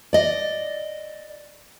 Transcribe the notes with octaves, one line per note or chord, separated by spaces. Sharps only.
D5 D#5